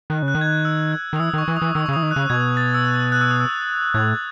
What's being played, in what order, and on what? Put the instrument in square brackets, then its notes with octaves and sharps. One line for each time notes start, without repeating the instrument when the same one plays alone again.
[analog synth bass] D#3 [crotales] F#6
[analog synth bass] C#3
[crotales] F#6
[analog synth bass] D#3
[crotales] G#6
F#6
E6
F#6
[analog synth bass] D#3
[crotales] D#6
[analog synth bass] E3 [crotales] E6
[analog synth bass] D#3
[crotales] C#6
[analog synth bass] E3
[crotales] D#6
[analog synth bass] E3
[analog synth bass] D#3 [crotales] E6
[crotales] C#6
[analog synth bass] C#3
[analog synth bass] E3 [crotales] D#6
[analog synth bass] D#3
[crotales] F#6
[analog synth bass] C#3
[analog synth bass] B2 [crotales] G#6
[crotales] A6
E6
F#6
F#6
E6
D#6
E6
[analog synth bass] A2 [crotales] G#6